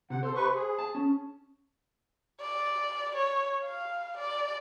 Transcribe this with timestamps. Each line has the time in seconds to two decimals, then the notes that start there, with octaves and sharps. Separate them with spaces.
0.10 C3 F#5
0.23 A4 C5
0.35 C3 B4 C#6
0.55 G#4
0.79 A5
0.95 C#4
2.40 D5
3.15 C#5
3.64 F5
4.17 D5